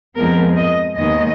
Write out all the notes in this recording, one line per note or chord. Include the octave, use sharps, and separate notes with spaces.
F2 F3 G#3 B3 A#4
D#5
D#2 D#3 G#3 B3 D#5